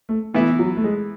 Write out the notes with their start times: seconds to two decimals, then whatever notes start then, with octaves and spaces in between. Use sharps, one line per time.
0.09 A3
0.34 E3 A3 B3 E4
0.59 F#3
0.77 A3
0.84 G#3